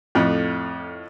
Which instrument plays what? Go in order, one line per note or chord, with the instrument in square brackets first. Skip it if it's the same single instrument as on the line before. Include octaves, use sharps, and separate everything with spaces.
[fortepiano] F2 A2